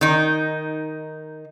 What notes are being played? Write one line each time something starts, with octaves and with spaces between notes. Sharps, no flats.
D#3 D#4